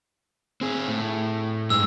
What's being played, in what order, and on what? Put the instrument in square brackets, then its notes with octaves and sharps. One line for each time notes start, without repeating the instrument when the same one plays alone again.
[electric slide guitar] C4 G#4
A2
[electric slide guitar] G2 G#3 [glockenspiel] E6